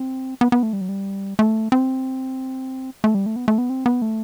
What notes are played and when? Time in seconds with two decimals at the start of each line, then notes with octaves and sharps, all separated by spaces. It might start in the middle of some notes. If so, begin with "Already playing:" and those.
Already playing: C4
0.41 B3
0.52 B3
0.63 A3
0.73 G3
0.81 F#3
0.89 G3
1.39 A3
1.72 C4
3.04 A3
3.14 G3
3.26 A3
3.36 B3
3.48 A3
3.58 B3
3.70 C4
3.86 B3
4.02 A3